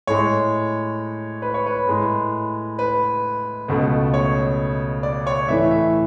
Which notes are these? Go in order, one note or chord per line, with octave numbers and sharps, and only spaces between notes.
A2 G#3 C#5
B4
C#5
B4
A2 G#3
B4
C#2 B2 A3
C#5
D5
C#5
A2 E3 A3 E5
E5